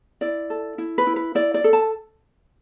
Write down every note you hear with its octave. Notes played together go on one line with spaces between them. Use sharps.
E4 D5
A4
E4
B4
E4
B4
E4 D5
D5
A4
A5